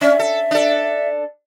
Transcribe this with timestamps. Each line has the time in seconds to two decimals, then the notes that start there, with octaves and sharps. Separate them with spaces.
0.01 C#4 E5
0.19 A4
0.51 D4 A4